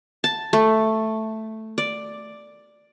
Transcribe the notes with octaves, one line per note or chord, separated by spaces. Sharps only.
A5
A3
D5